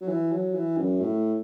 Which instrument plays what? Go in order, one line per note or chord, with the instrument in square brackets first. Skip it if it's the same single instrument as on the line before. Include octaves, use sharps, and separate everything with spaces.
[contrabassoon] F#3
E3
F#3
E3
F#2
A2